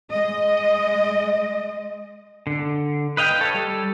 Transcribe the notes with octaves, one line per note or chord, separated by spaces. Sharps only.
G#3 D#5
D3
B4 D#5 F5 G5
A4 C#5
G3 A4